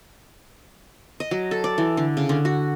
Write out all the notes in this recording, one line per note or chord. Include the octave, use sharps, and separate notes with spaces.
D#5
F#3
A4
D5
E3
D3
C#3
D3
F#4